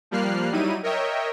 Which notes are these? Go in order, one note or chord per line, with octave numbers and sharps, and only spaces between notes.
F3 G3 A#3 F6 F#6 C7
F#3 G3 D#4 E4 D#7
A#4 C#5 D#5 E5 G5